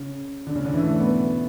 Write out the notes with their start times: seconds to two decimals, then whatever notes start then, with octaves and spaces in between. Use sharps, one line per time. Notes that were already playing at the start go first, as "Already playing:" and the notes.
Already playing: C#3
0.47 D3
0.56 C#3
0.65 D3
0.74 E3
0.82 A3
1.00 B3